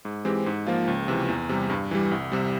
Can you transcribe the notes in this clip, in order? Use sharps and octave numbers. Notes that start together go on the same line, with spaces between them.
G#2
E3 G#3 C4 G4
G#2
F3 A#3 F4
C#2
C3 E3
E2
C3 G3
G2
E3 G3
C2
C3 G3